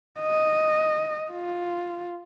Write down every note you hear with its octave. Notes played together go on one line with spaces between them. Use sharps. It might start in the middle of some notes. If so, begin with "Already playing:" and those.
D#5
F4